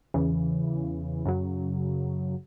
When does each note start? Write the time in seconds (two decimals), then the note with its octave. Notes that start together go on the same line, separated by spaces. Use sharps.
0.14 E2 C#3 E3
1.25 F#2 C#3 F#3